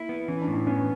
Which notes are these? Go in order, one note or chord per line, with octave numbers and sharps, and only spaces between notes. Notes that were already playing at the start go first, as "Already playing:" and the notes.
Already playing: A#3 E4
B3
E3 C#4
D4
A2
D4
B3 C#4